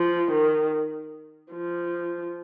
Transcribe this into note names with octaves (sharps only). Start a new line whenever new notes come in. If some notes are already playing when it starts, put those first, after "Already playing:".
Already playing: F3
D#3
F3